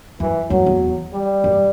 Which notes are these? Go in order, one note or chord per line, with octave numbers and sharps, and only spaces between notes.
F#2 E3
F#2 F#3
E2
G3
F#2